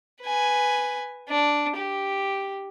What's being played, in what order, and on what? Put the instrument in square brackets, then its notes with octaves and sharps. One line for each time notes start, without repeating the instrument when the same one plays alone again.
[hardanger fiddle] B4 G#5
D4
G4